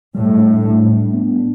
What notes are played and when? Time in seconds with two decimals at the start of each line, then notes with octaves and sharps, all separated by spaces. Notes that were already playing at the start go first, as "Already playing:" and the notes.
0.15 A2 G3
0.39 D4
0.64 G3
0.88 D4
1.14 B3
1.39 D4